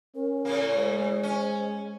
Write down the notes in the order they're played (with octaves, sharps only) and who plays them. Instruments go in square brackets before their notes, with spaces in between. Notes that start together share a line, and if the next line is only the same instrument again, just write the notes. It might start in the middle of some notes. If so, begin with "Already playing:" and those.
[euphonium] C#4 [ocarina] A#4
[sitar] A2 C#3 A#3
[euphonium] G#3 [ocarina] C5
[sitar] C#4